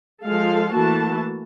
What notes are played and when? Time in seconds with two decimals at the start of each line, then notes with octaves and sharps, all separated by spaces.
0.24 F3 G#3 A4 F5
0.73 E3 A3 A#3 F#4 A5